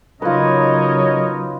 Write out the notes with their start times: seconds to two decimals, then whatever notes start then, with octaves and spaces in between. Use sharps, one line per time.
0.22 C#3 F#3 D#4 F4 A#4 B4 C#5 D#5